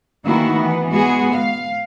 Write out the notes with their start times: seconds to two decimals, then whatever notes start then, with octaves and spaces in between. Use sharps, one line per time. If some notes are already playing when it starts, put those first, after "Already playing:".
0.24 D#3 E3 A3 A#3 E4 F#4
0.54 E3 B3
0.91 G#3 B3 F#4 G#4
1.34 F5